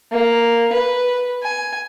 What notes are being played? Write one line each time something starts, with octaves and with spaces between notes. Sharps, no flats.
A#3
B4
G#5